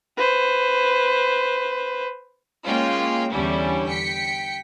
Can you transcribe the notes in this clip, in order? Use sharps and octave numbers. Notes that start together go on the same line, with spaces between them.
B4 C5
G#3 A#3 C#4 F4 G5
E2 D3 G3 C#4 D4 E4
G5 B6 C#7